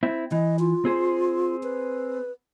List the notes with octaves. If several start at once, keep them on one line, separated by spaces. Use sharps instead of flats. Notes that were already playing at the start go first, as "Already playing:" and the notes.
C4 E4
E3 D#5
F4
C4 G#4 C5
B4